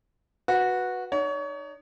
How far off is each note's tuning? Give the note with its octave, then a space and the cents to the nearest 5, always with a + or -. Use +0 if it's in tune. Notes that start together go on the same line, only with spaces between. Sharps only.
F#4 -10 B4 -10
D#4 -30 C#5 +30